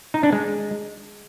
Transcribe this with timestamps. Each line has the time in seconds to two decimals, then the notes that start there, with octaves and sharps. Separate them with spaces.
0.14 D#4
0.23 D4
0.32 G#3